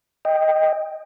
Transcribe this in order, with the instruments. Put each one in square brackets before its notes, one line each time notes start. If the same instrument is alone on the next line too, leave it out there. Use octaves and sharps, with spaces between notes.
[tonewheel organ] D#5 G5